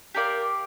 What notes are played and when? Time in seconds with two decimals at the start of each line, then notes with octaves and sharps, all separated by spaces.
0.15 G4 A#4 D5 F5